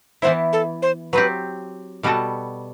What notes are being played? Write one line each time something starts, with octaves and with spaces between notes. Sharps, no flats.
E3 B3 E4 C5
A4
C5
F#3 C4 G4 B4
B2 G3 B3 F#4 A4